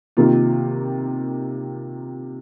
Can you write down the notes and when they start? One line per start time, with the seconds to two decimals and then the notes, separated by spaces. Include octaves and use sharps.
0.17 C3 D#3 A#3 F4